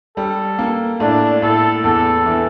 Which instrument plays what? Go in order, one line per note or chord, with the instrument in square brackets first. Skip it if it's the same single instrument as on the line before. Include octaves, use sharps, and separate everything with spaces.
[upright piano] G3 [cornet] A4
[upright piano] A#3
[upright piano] A2 [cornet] D4
[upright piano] A2 [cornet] A4
[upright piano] E2 [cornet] A4
[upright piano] E3